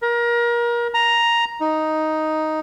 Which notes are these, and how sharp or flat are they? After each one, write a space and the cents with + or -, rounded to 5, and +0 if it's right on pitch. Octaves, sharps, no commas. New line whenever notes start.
A#4 +30
A#5 +5
D#4 +5